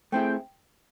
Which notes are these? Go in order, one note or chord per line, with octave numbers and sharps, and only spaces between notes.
A3 C4 E4 G#4 G5